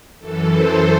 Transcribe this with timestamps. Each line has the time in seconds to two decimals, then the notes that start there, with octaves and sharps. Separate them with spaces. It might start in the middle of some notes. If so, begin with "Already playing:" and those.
0.19 F#2 E3 A4
0.50 C5